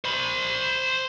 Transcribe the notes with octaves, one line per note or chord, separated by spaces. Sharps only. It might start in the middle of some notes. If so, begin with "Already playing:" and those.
C5 B5